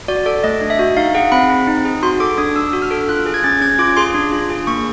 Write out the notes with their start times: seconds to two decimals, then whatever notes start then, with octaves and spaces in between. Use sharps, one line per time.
0.08 F#4 D5
0.26 A4 D5
0.43 A3 D#5
0.61 D4
0.70 E5
0.79 F#4
0.96 D#4 F5
1.15 G#4 F#5
1.32 C4 B5
1.50 C4
1.67 D#4
1.85 G#4
2.03 F#4 C6
2.20 A4 D6
2.38 D4 D#6
2.56 D4 E6
2.73 F#4
2.82 F6
2.91 A4
3.09 F4 F#6
3.26 G#4
3.34 G#6
3.44 C#4 A6
3.61 C#4 G#6
3.79 F4 D6
3.97 G#4 C6
4.14 D4
4.32 F4
4.50 G#4
4.67 A#3 C#6